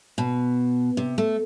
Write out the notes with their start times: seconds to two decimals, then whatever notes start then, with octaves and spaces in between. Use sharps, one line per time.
0.18 B2
0.97 C3
1.18 A3